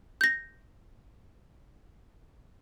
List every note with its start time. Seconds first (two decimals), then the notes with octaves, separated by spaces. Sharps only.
0.21 G6 A#6